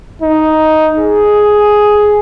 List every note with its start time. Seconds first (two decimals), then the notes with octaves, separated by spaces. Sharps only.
0.22 D#4
0.98 G#4